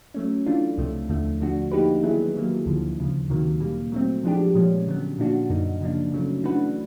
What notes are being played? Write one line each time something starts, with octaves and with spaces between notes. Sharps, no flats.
F#3 A3 C#4
E3 A3 D4 F4
C#2 C3 F3 A3
D#2 D3 F3 A3
D3 F3 A3 D4 F#4
F3 A#3 D#4 G4 B4
D#3 F#3 B3 E4 G#4
D#3 F#3 A#3
D2 D3 F3
D#2 C#3 F3
D2 C3 D#3 F#3 A#3
A#2 G3 A#3
F#3 A3 C4
F3 G#3 B3 D4 G4
A#2 F3 G#3 C#4
D3 F#3 B3
A#2 F3 A#3 D4 F#4
F#2 D3 F#3 A#3 D#4
C#3 F3 A#3 D4
C#3 F#3 A3 C#4
E3 A3 D4 F#4 B4